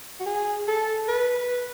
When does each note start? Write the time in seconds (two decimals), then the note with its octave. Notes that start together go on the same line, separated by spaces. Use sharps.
0.20 F#4
0.26 G#4
0.68 A4
1.08 B4